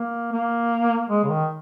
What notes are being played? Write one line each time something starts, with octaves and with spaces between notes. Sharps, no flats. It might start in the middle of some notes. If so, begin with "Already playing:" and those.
Already playing: A#3
A#3
G#3
C#3
D#3